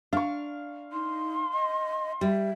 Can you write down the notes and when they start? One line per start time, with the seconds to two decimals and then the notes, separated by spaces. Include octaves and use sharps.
0.13 D4 F5 C#6
0.92 D#4 C6
1.53 D#5
2.21 G3 E5